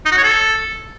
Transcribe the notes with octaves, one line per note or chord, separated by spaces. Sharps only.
D#4
F#4
C#5
A4